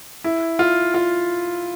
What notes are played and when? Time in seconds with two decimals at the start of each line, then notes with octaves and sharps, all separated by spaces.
0.24 E4
0.59 F4
0.94 F4